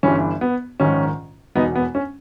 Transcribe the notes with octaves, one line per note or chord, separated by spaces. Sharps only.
G1 G2 E3 C#4
B3
A#1 G#2 D#3 C#4
E1 E2 B2 B3 D#4
B3
C#4